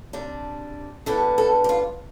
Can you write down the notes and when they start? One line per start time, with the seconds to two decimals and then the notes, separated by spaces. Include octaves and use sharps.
0.13 C3 G3 D4
1.06 E2 D3 G3 B3 A4
1.38 A4
1.64 G4
1.69 F4